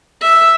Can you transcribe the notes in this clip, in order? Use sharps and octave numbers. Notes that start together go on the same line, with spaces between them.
E5